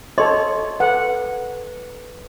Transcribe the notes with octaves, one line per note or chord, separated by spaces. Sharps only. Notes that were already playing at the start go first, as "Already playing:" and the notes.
A4 C#5 D#5 C6
A4 B4 F#5